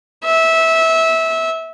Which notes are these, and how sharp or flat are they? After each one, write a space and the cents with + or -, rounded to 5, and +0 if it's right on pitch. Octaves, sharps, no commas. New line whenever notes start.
E5 -20